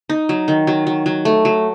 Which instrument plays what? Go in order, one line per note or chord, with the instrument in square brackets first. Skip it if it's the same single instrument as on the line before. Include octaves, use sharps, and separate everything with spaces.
[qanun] D#4
F#3
D#3
F#3
F#3
F#3
A3
F#3